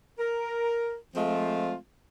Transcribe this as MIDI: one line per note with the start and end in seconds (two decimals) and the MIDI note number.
0.19 0.97 70
1.15 1.75 53
1.15 1.75 56
1.15 1.75 57
1.15 1.75 60
1.15 1.75 65